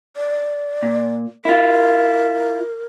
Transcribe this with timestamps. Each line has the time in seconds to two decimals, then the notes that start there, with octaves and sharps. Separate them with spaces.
0.16 D5
0.83 A#2
1.45 E4 F4 A#4